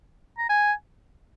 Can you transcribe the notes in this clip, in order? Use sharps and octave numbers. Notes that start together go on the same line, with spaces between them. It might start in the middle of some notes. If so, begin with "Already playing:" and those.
A#5
G#5